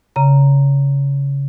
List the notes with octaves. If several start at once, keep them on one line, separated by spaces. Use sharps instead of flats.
C#3 A#5